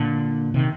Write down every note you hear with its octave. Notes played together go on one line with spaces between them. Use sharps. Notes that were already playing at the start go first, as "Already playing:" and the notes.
Already playing: A#2 D3
C3 D#3